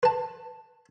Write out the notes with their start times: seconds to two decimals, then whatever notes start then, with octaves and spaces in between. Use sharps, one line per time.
0.03 B4 A5